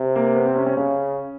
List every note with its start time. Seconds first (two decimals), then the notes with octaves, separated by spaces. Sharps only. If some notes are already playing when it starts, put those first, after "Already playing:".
Already playing: C3
0.16 A#3
0.35 B3
0.45 C4
0.56 C#4
0.66 C#4
0.76 C#3 C#4